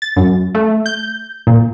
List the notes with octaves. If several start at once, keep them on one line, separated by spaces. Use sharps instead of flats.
A6
F#2
A3
G6
A#2